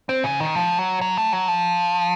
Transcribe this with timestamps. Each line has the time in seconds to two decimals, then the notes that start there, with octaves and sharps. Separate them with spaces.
0.09 C4
0.24 C#3
0.40 D#3
0.55 F3
0.78 F#3
1.01 F#3
1.18 A3
1.33 F#3
1.48 F3